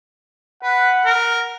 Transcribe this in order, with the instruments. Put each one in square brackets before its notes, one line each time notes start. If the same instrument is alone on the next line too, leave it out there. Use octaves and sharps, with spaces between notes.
[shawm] B4 [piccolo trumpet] F#5
[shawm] A#4